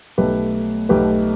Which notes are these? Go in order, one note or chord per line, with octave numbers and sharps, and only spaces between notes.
B1 B2 A3 G4 B4
B1 B2 A3 G4 B4